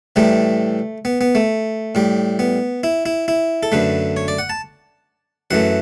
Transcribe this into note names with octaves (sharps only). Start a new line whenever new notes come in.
A2 E3 G3 A3
B3
B3
A3
A2 G3
B3
E4
E4
E4
A4
F#2 D3 A3 B4
C#5
D5
F#5
A5
F#2 E3 A3 F#5